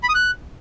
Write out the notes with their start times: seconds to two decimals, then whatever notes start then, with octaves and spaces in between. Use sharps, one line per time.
0.03 B5
0.09 D#6
0.15 F#6